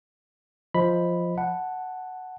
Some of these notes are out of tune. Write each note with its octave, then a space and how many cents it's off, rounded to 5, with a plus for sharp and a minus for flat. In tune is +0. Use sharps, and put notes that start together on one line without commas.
F3 +0 D#5 +0 B5 +0
F#5 +0 A5 +0